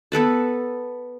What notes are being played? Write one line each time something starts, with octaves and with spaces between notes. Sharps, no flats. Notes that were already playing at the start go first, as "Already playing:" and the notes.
B3 A4 B4 A5